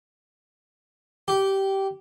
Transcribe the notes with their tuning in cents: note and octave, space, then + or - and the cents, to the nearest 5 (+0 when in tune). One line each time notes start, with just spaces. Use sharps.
G4 -15